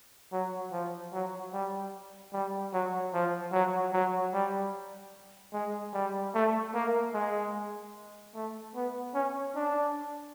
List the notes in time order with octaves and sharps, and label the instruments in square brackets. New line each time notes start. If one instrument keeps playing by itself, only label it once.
[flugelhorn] F#3
F3
F#3
G3
G3
F#3
F3
F#3
F#3
G3
G#3
G3
A3
A#3
G#3
A3
B3
C#4
D4